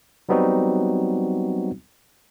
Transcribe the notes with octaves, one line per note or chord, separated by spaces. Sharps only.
F#3 G3 B3 C4 D#4 F#4